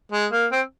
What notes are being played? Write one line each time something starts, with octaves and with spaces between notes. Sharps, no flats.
G#3
A#3
C4